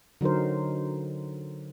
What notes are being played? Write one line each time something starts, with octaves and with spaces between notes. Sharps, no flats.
D3 F#3 D#4 A#4 C5